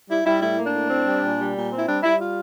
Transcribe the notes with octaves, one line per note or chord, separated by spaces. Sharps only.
G3 E4
G3 E4
A2 E4
A#3
D4
A2
C4
G3
A#2
G3
A#2
C4
E4
G3 D4
G3 E4
F4